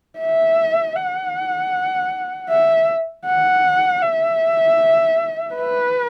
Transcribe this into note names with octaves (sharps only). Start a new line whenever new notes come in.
E5
F#5
E5
F#5
E5
B4